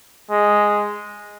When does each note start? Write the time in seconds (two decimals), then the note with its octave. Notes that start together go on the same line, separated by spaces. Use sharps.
0.30 G#3